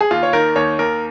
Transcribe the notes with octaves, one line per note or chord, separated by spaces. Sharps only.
G#4
D#2 F4
C#5
D#3 A#4
D#2 C#5
D#2 A#4